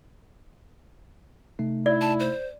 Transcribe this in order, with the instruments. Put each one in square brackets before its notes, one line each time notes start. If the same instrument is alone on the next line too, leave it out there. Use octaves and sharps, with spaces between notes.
[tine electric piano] C3 A3 D#4
[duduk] E4 [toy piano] D5
[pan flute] A5
C5